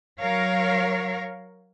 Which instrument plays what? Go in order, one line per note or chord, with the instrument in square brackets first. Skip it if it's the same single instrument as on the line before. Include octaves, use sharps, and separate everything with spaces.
[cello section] F#3 A#4 C#5 F5